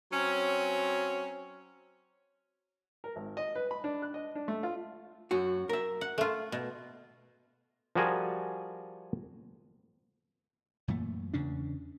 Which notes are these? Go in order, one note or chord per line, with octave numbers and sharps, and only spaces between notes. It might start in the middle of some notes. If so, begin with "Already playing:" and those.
F#3 C4 C#4
A#4
G#1
D#5
B4
B5
D4
F#6
D#5
D4
A3
F4
F#2 F#4
A#4 E5
F#5
A3 F4
B2
F3 G3 F#4 G#4 A#4 G#5
F#2 A#2 E3 A3
E2 C#3 C#4 D4